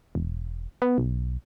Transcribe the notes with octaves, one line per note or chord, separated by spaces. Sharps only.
E1
B3
B1